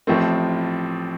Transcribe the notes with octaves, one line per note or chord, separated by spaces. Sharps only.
A1 A2 F3 A3 C4